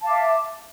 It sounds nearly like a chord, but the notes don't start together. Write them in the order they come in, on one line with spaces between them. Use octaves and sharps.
A5 F5 D6 E5